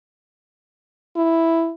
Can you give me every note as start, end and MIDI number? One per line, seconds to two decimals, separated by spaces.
1.17 1.72 64